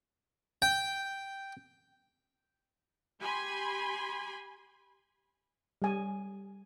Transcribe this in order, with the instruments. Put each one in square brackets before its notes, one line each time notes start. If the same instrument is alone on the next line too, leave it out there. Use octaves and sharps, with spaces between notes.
[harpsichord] G5
[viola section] G4 G#5 B5 C6
[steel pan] G3 G#5